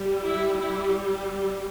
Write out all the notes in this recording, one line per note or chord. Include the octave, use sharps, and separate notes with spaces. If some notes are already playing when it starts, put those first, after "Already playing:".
Already playing: G3
E4
E4